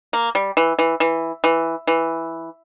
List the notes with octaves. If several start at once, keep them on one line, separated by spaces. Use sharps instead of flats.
A#3
G3
E3
E3
E3
E3
E3